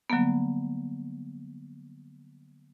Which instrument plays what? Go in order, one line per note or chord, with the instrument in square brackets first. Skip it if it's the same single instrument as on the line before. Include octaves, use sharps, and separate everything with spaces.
[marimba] D3 F#3 G3 A#3 B3